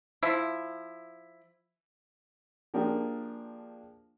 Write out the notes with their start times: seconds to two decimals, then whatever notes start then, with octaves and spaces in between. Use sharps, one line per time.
0.23 F3 E4
2.74 F3 A#3 D4 G4 G#4